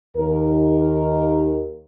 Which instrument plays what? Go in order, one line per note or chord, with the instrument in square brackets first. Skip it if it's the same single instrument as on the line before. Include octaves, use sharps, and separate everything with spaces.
[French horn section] D#2 A#4